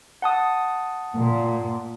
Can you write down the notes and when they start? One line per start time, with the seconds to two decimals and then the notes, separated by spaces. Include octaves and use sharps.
0.22 F#5 A5 D#6
1.15 A#2